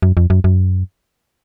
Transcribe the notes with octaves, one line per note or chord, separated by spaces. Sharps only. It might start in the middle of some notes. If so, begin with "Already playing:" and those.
F#2
F2
F#2
F#2